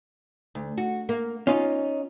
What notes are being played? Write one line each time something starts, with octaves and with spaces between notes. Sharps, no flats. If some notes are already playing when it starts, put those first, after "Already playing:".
D2
F#4
A#3
C#4 D#4 F4